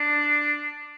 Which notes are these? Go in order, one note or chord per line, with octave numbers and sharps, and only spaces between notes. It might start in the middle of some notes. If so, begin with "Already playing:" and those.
Already playing: D4